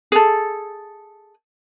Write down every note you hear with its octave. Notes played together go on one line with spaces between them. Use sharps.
G#4 A4